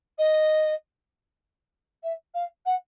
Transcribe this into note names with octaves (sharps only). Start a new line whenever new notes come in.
D#5
E5
F5
F#5